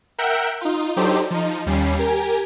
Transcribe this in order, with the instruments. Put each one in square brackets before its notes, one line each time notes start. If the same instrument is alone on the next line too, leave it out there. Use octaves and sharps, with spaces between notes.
[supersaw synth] A#4 E5 F#5 G5
D#4 F4
F#3 D4 D#4 G4 A4 C5
F3 D#4
D#2 G3 C#4 C7
G4 A#4 G#5